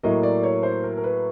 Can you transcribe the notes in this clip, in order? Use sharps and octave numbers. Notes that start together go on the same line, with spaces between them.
A2 F#3 A#3 D#5
D5
C#5
C5
A#4
A#4
B4